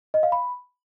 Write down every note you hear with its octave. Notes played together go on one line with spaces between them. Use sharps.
D#5
F5
B5